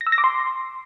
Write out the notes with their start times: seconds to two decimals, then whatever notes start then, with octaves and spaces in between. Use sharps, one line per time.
0.01 A#6
0.07 E6
0.12 A#6
0.18 D6
0.24 C6